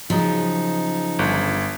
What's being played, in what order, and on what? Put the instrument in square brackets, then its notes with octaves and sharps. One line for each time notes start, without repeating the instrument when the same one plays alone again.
[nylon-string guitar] C#3 F#3 [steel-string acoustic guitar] F3 [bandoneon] D#4
[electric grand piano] G1